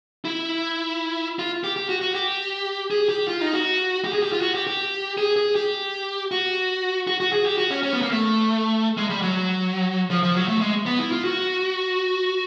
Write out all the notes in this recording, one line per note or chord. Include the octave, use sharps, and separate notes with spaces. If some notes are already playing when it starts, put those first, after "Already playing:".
E4
F4
G4
G4
F#4
F#4
G4
G#4
G4
F4
D#4
F#4
G4
G#4
G4
F4
F#4
G4
G4
G#4
G#4
G4
F#4
F#4
F#4
G#4
G4
F#4
C#4
C#4
B3
A#3
A3
G#3
G3
F#3
F3
F3
F#3
A3
G#3
B3
E4
F4
F#4